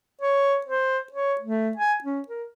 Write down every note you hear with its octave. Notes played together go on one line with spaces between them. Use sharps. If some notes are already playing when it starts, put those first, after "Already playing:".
C#5
C5
C#5
A3
G#5
C#4
A#4